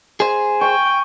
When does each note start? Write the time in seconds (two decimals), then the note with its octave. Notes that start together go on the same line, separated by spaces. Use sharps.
0.20 G#4 C5 G#5
0.61 G5 C#6